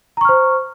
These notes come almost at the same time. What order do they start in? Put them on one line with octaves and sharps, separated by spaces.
A#5 C#6 F6 C5